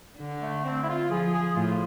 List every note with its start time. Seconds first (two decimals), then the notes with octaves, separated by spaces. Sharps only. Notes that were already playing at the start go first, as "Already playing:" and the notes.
0.18 D3
0.41 A3
0.64 C4
0.82 E4
0.87 F4
1.09 F3 G#4
1.33 G#4
1.55 A2 F4